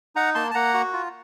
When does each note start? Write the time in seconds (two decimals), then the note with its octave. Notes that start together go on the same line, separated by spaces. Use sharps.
0.16 D#4 F#5 A#5
0.35 A#3 A5 C6
0.51 A5
0.54 A#3 F#5 A#5
0.74 F#4
0.93 F4